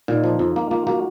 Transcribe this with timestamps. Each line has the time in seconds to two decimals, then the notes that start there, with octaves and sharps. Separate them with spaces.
0.08 A#2 D#4
0.24 F3
0.39 F2 F4
0.56 A#3
0.71 A#3 F4
0.87 A#3 F#4